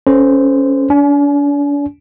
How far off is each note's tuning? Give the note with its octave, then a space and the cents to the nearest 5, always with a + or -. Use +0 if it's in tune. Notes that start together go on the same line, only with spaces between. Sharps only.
C#4 -5 A4 +0 C5 -20
D4 -40 G#5 +35